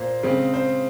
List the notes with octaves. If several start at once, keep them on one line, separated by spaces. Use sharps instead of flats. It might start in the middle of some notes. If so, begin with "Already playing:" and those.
Already playing: A#2 C5
C#3 G#3 C4
C5